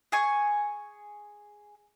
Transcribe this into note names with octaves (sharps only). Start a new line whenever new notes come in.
G#4 G#5 C#6